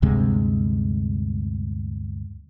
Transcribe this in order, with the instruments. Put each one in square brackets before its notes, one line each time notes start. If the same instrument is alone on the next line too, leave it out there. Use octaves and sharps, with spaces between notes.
[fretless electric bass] D2 G2 C3 G#3